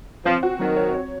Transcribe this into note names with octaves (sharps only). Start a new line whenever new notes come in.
F3 C4
F#4
D#3 F#3
C#5
C#5